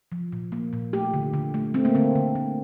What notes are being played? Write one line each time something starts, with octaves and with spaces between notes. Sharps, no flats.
F3
A#2
A#3
A#2
A3 G4
D3
D3
A3
A3 C4
A#3
D3 C4
D3
A3